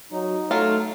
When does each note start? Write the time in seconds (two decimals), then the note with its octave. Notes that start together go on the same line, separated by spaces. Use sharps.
0.12 F#3 D#4
0.51 F#3 A3 F4